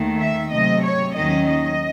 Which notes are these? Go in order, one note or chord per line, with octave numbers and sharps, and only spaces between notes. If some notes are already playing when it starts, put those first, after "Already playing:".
Already playing: D#2 D#3 A3
E5
C3 F#3 A3 C4 D#5
C#5
D#2 D#3 F#3 C#4 D#5
D#5